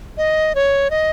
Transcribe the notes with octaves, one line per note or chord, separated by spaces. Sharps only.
D#5
C#5
D#5